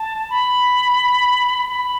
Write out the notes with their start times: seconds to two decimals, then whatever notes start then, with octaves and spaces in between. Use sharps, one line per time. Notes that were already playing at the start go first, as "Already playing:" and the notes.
Already playing: A5
0.30 B5
1.69 B5